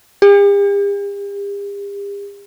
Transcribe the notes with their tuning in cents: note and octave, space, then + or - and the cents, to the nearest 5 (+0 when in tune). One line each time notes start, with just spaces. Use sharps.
G4 +45